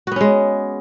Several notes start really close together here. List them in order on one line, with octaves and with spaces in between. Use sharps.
F#4 B3 C#4 G#3